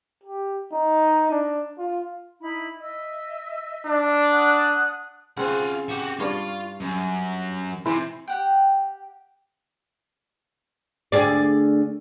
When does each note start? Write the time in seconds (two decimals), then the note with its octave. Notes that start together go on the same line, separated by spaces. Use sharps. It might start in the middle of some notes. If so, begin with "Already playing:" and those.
0.23 G4
0.73 D#4
1.31 D4
1.78 F4
2.41 D#4 E4 B5
2.81 D#5 E5 E6
3.87 D4
4.32 F#5 D#6 F#6
5.37 C#3 C4 F4 F#5
5.89 F#4 G4
6.20 G2 F4 C#5 D5
6.80 F#2
7.86 C3 E3 E4 C5
8.28 G4 F#5 G5
11.12 D2 G#4 D5